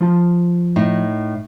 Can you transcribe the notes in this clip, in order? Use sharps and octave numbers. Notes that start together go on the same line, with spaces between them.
F3 F4 A5
A2 D#4